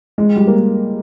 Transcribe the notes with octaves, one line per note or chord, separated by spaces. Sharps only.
G#3
G3
A#3